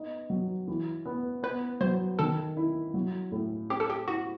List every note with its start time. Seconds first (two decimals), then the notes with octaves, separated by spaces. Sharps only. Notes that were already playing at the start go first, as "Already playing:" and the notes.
Already playing: B3 D#4
0.30 F#3
0.68 E3
1.05 B3
1.43 B3 B4
1.81 F#3 C5
2.19 D#3 A4
2.57 E4
2.94 F#3
3.32 A2
3.70 C4 G4
3.80 A4
3.90 G4
4.08 E4 F#4